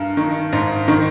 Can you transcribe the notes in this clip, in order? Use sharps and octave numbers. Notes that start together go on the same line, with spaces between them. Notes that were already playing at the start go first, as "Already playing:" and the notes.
Already playing: G2 A#4
D#3
G#2
D#3